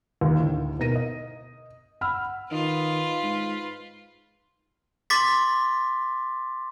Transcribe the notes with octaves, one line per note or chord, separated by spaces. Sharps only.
D#2
D2 A2
B2 D#4 A#4 A#6 D#7
D#5
F#5 B5 E6 F6
D#3 F4 B4
G#2
C6 D6 A6 B6